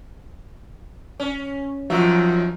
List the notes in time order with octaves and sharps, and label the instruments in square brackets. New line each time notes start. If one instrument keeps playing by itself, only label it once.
[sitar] C#4
[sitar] F#2 D#3 E5 [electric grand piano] F3 F#3